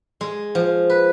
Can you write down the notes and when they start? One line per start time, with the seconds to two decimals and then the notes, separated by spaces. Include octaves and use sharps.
0.21 G#3
0.55 F3
0.90 B4